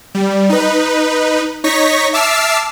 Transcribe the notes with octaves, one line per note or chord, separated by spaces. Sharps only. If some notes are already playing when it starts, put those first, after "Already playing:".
G3
D#4 B4
D#4 C#5 C#6 A#6 B6
E5 A5 D6 E6 F6 C7